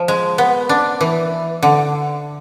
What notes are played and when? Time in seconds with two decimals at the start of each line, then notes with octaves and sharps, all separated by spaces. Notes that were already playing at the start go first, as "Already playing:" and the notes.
Already playing: F3
0.08 G#3
0.38 B3
0.69 D4
1.01 E3
1.63 D3